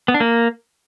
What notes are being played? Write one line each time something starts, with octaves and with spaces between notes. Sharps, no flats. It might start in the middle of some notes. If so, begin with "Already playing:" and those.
B3
D4
A#3